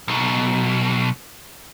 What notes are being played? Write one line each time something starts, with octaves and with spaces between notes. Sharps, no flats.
B1 B2